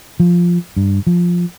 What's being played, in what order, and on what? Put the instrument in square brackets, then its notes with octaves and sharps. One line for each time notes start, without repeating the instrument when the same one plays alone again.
[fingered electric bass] F3
G2
F3